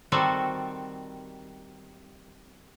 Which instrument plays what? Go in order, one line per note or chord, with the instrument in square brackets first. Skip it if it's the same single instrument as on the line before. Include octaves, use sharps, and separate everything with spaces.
[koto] D#3 G3 C4 F#4 A4